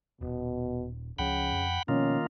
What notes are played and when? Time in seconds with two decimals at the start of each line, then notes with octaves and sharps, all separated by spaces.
0.21 D#1 B2
1.18 C#2 C#3 F3 F#5 G5 B5
1.53 F2
1.88 B2 D#3 F3 A#3 B3 C#4 F4